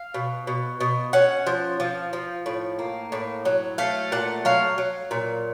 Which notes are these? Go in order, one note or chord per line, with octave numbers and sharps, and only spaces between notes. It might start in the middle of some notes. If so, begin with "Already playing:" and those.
Already playing: F5
B2
B2
B2
C#4 F#5
F3
F3
F3
A2
A#3
A2
F#3
A3 F5
A#2 F#5
F#3 F5
F#3
A#2